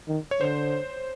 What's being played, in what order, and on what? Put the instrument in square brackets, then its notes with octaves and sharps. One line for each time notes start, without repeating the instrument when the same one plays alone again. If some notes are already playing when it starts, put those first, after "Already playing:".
[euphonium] D#3
[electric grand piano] C#5
[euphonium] D3 [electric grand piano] C5